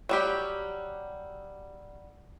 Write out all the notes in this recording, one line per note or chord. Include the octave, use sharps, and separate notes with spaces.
F#3 G3 G4